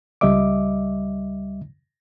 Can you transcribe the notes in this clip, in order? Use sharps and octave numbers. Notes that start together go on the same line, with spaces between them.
C#2 G3 D#5 E5 D6